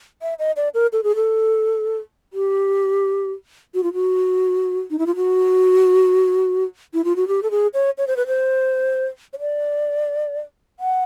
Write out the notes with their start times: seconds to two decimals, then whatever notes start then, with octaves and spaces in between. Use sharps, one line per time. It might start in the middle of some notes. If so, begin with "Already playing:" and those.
0.22 E5
0.39 D#5
0.56 D5
0.74 A#4
0.93 A4
1.03 G#4
1.15 A4
2.33 G4
3.74 F#4
3.83 F4
3.93 F#4
4.91 D#4
4.99 E4
5.06 F4
5.16 F#4
6.94 E4
7.04 F4
7.16 F#4
7.28 G4
7.43 A4
7.51 G#4
7.74 C#5
7.98 C#5
8.07 C5
8.17 B4
8.27 C5
9.33 C#5
9.40 D5
10.80 F#5